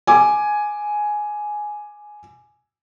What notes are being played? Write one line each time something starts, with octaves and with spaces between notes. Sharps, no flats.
G#5 D6